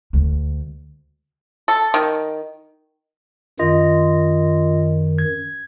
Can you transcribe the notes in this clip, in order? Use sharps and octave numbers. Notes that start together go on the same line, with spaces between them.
D2 G#3
A4
D#3
F#2 D#3 F4 D#5
G#6